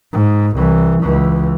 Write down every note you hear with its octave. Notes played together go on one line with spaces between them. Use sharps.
G#2
C2 E3
C#2 E3